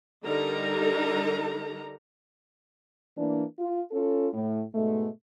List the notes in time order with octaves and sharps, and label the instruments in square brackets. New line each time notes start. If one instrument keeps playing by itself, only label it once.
[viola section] D3 G3 D#4 A4 A#4 A#5
[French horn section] E3 A#3 D4
F4
C#4 F4 A4
A2
G#2 B2 G#3 A3